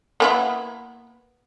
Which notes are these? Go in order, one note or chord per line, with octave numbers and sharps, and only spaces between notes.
A#3 B3 E4